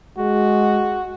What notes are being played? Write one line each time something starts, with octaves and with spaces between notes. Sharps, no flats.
G#3 F#4